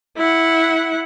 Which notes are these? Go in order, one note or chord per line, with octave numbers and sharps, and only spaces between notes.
E4 F#5